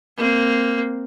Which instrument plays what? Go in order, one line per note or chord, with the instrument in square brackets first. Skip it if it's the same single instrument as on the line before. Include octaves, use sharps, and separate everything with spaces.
[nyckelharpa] A#3 C4